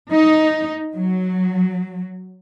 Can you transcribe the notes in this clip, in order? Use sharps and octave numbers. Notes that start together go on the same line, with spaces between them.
D#4
F#3